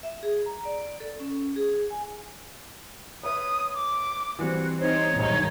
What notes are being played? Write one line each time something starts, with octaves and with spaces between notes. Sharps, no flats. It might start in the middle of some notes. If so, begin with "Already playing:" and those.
E5
G#4
A#5
D5
A4
C#4
G#4
G#5
B4 C#5 E5 D#6
D6
E3 G3 C4 F#4
C4 D#4 C5 C#5
E1 B1 G2 D#3 D#4